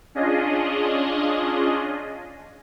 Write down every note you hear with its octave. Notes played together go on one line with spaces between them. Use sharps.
C#4 D4 F4 G#4 D#5